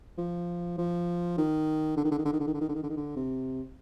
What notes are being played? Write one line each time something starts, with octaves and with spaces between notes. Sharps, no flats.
F3
F3
D#3
D3
D#3
D3
D#3
D3
D#3
D3
D#3
D3
D#3
D3
D#3
D3
D#3
D3
C3